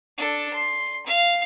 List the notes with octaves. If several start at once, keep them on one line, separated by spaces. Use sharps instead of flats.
D4 A4
C6
F5